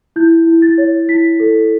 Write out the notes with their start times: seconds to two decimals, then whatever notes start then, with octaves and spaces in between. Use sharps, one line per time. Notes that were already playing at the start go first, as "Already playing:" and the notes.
0.16 E4 G6
0.47 E4
0.62 A6
0.78 C#5
1.09 E4 B6
1.40 A4